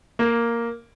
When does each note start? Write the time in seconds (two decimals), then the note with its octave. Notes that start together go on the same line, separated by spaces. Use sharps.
0.19 A#3